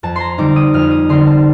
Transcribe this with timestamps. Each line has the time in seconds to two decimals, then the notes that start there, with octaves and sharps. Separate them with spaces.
0.03 F2 A5
0.16 A#5 C6
0.38 D3 G3 C4 D#4 D6
0.56 D#6
0.74 F2 F6
0.91 D#6
1.09 D3 G3 C4 D#4 C6
1.27 A5